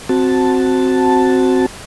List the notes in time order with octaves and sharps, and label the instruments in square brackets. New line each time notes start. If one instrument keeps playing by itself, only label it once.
[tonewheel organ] C4 F#4 A5